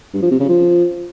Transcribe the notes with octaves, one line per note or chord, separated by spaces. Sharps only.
G2
F3
C3
C#3
F3